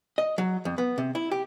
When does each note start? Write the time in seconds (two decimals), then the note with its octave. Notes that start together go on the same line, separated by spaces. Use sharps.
0.18 D#5
0.38 F#3
0.65 F2
0.78 B3
0.98 C3
1.15 E4
1.31 G4